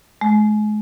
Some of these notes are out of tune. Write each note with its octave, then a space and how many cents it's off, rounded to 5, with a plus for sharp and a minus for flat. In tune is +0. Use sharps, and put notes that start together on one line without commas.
G#3 +35